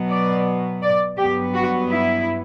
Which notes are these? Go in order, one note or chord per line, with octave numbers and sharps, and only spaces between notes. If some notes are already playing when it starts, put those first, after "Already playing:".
Already playing: B2 F#3 B3
D5
D5
G2 F#3 B3 G4
F#4
E4